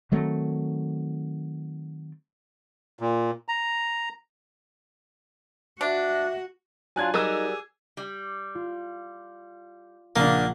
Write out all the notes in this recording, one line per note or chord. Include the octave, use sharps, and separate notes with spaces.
D#3 F#3 A3 C4
A#2
A#5
D4 F#4 E5
F#3 D4 F4 G#5 F#6 G#6
F#3 G3 D#4 G#4 A#4 D6 E6
G3
F4
A#1 C#3 A#3 D4 F#5 A#5